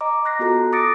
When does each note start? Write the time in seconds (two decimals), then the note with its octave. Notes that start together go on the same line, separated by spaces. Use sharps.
0.01 D#5 A#5 D6
0.25 C6 F#6 A#6 C7
0.39 B3 F4 F#4 A4 A#5
0.73 D6 D#6 A6 A#6 C#7 D7